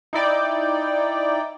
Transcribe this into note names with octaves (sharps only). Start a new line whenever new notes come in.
D#4 E4 D5 G5